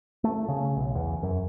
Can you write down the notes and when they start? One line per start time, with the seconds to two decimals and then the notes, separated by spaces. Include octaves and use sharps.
0.24 A3
0.49 C#3
0.76 B1
0.95 E2
1.23 F#2